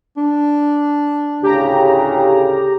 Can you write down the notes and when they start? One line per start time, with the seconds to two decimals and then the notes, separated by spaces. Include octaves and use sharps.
0.17 D4
1.43 D2 A2 C#3 G4 A#5